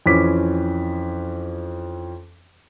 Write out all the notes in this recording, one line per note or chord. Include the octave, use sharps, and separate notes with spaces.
F2 E3 C#4 D6 B6